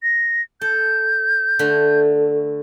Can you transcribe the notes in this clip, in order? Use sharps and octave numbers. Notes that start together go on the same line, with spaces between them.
A#6
A4 G6
D3 A3